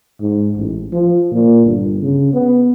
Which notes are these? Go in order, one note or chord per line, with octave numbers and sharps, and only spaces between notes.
G#2
A1
F3
A#2
G1
C#3
B3